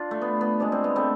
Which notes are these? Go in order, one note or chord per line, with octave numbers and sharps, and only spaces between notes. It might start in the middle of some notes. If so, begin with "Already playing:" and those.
Already playing: D4 F4
A3
B3
B3
C3 G#3 D4
C4
B3
A3 C4